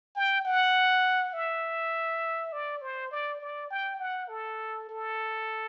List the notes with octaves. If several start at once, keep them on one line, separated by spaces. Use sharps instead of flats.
G5
F#5
E5
D5
C5
D5
D5
G5
F#5
A4
A4